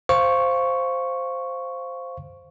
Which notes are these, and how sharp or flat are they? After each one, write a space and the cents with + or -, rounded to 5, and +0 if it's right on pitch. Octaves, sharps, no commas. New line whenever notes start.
C5 +0 F5 +0 C#6 +0